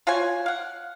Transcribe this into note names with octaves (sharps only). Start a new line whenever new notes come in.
F4 F#4 C#5 G#5
F5 F#5